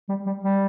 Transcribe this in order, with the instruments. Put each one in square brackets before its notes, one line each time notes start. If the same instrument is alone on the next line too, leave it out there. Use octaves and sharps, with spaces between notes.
[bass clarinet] G3
G3
G3